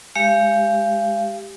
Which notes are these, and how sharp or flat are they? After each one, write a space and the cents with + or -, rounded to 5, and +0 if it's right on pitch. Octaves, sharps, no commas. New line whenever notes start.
G#3 +0 G4 +0 F5 -30